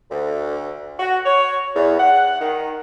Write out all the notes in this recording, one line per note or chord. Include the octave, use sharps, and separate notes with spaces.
D2
F#4
C#5
E2
F#5
D#3